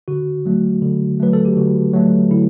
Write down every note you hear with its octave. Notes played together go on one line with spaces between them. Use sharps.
D3 F#4
F#3 A3
D3
F#3 A3 B4
A4
G4
D3 F#4
F#3 A3
D3 E4